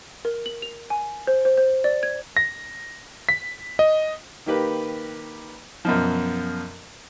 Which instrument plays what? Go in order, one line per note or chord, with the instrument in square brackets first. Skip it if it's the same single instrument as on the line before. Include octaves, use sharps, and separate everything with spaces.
[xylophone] A#4
F#7
F7
G#5
C5
C5
C5
D5
G#6
[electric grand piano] A#6
B6
D#5
[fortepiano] D#3 A#3 G4 B4
F#2 B2 F3